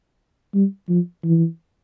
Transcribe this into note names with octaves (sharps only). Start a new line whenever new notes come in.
G3
F3
E3